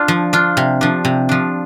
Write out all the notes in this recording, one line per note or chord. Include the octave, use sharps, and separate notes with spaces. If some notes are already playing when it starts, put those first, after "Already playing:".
Already playing: D4 F4 D5
F3
D4 F4
C3
F3 D4
C3
F3 D4